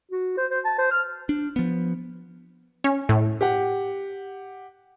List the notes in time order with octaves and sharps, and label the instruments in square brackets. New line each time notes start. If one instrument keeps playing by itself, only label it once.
[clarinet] F#4
C5
C5
A5
C5
F6
[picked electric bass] D4
F3 B3
[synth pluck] C#4
A2
[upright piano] G4 F#5